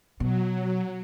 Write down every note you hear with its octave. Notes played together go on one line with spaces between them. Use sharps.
B2 F#3